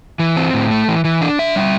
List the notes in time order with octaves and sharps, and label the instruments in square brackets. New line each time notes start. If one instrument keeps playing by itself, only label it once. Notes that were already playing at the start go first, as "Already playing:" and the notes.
[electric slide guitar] E3
C4
A2
A3
E3
E3
D4
E5
G3